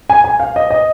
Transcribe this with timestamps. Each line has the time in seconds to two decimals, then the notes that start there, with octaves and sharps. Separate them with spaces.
0.10 G#5
0.24 G#5
0.40 F5
0.56 D#5
0.70 D#5